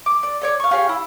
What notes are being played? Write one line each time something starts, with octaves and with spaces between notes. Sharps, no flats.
D6
D5
A4 C#5 D5
F5 C#6
F4 G4 G#4 C#5
E4